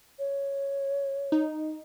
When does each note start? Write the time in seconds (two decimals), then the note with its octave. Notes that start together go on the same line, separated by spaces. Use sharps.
0.19 C#5
1.32 D#4